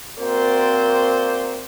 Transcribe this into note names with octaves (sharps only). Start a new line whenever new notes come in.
A#3 C4 F#4 A#4 C5 D5